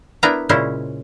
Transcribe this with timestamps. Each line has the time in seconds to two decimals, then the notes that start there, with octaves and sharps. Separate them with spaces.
0.23 B3 D4 E4 A#4 B4 A#5
0.49 A#2 C#3 G#3 C#4 E4 C5